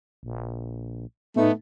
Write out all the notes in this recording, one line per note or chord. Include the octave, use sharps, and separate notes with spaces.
A#1
A2 A3 B3 D#4